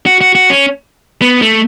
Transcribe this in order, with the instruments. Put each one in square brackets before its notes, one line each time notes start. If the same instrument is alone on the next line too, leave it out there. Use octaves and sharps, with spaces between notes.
[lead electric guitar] F#4
F#4
F#4
C#4
B3
A3